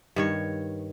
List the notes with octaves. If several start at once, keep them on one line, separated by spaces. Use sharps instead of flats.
G2 D#3 C#5